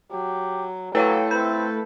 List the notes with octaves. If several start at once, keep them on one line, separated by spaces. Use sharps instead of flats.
F#3 G4
F#3 A3 E4 A4 B4 C#5 F5 G5
C4 B4 G6